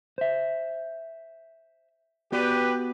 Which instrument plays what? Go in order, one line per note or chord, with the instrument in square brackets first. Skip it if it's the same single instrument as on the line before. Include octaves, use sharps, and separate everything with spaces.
[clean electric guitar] C5 E5
[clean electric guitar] B3 F#4 D5 [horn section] G4 B4